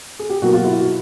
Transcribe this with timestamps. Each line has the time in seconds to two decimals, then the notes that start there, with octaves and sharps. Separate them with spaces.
0.19 G#4
0.30 G4
0.42 B2 F#3 A#3 F#4
0.53 F4
0.64 E4
0.81 F#4